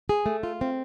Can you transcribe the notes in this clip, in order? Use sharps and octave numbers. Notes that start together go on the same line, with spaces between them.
G#4
A3
F4
C4